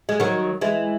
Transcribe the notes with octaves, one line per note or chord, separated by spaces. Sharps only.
G#3
D#3 F#3
E3 G#3